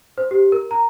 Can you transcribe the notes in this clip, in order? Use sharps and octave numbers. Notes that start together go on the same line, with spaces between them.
C5
G4
A#4
A#5